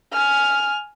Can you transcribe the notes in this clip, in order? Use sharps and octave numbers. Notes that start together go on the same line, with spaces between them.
G#5 F6